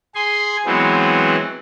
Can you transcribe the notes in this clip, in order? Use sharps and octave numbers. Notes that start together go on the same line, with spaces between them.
G#4 G#5 C6
E3 F#3 G#3 B3 C4